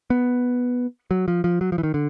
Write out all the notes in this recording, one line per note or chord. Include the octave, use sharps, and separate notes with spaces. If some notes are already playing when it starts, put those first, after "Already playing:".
B3
F#3
F3
F3
F#3
F3
E3
D#3
D3